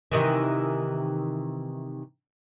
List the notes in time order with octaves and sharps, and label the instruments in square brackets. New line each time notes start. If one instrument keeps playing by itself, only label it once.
[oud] C3 D#3 E3